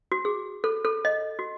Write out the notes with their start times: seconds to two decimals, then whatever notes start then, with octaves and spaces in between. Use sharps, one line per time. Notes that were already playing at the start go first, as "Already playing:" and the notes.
0.12 F#4
0.25 G#4
0.64 A4
0.85 A4
1.05 D#5
1.39 F#4